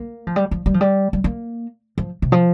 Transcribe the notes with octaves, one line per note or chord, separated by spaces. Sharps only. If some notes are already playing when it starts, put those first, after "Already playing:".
Already playing: A#3
F3
G3
F3
G3
F3
G3
G3
A#3
F3
C3
F3